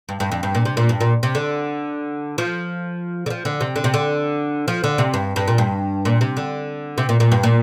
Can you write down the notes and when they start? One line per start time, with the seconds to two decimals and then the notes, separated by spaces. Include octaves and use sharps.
0.09 G2
0.20 G2
0.31 F2
0.43 G2
0.55 A#2
0.65 C3
0.77 A#2
0.89 G2
1.01 A#2
1.23 C3
1.35 D3
2.38 F3
3.26 D3
3.30 F3
3.45 D3
3.61 C3
3.76 D3
3.84 C3
3.94 D3
4.68 F3
4.84 D3
4.98 C3
5.14 G2
5.36 G2
5.48 A#2
5.58 G2
6.05 A#2
6.21 C3
6.37 D3
6.98 C3
7.09 A#2
7.20 A#2
7.32 G2
7.43 A#2